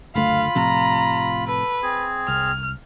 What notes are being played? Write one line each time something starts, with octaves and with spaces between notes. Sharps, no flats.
F#1 D2 A3 F4 F5 B5
A2 C3 F3 A#5
A4 B4
C4 G#4
C2 F6